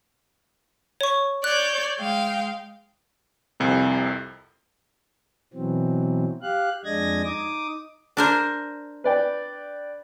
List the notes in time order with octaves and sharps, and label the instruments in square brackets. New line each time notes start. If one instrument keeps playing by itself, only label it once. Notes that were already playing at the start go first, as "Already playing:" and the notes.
[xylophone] C#5 C#6
[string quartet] C#5 D5 G6 [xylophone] F#6
[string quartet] G#3 F5 G5
[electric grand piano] C2 F2 C3
[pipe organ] B2 E3 F#3 C4
G4 F5 F#6
F2 G#3 D4 D#5 G#6 A#6
D#4 D6 D#6
[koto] D4 A#4 C5
[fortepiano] B4 D5 G5